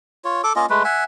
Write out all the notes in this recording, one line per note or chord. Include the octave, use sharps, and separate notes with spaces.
F4 C#5
A4 D6
A#3 C#4 F4 D#5
G#3 A3 B4
E5 F#5 G#5